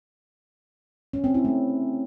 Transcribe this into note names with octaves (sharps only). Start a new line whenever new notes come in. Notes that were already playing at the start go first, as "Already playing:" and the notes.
C#4
C4
E4
A3